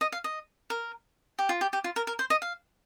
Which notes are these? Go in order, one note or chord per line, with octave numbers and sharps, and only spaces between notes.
D#5
F5
D#5
A#4
G4
F4
G4
G4
F4
A#4
A#4
C5
D#5
F5